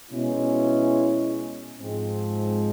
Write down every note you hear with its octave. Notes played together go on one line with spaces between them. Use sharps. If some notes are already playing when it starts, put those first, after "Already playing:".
B2 G#3 C#4 E4
G#2 F3 G#3 C4